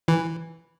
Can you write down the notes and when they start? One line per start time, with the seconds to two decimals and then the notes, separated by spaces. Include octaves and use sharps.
0.08 E3